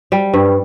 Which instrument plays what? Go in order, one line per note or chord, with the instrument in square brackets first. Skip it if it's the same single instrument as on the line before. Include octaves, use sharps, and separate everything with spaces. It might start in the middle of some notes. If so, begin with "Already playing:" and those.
[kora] G3
G2